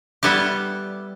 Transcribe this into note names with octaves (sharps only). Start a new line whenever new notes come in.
G3 B3 E4 G4